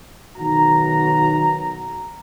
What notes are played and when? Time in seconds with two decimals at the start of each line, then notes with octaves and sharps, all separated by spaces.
0.38 B1 D#3 F#4 A#5